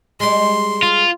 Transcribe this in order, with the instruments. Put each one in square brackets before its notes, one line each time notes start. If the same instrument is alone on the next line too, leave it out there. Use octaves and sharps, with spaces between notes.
[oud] G3 G#3 [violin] C6
[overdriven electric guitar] F4